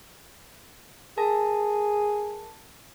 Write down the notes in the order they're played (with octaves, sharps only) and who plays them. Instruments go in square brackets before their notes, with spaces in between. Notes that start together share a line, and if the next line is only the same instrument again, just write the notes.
[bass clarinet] G#4 [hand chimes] A#4 A5 A#6